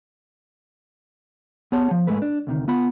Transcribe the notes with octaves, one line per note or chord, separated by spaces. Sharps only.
B3 G#4 C#5 F#5 A5
F3
G#2 G#3 A3 B4
D4
D2 C3 D#3
B3 F4 F#5 B5